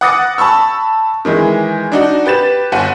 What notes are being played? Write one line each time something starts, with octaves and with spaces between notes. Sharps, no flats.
F#5 D6 D#6 A6 A#6 C#7
A5 B5 C#6 E6
D#3 E3 G#3
D4 D#4 F#4
G4 B4 A6 E7
G1 F#5 D#7